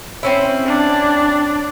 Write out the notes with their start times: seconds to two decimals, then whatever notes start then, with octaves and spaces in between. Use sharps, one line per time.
0.23 C4 C#4 E4
0.66 D4